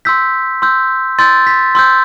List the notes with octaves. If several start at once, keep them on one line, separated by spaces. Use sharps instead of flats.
C6 E6 G6 B6
C6 E6 G6
C6 E6 G6 A6
B6
C6 E6 G6